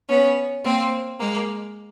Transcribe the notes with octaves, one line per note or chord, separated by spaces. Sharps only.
B3 C#4
A#3 C4
G#3 A#3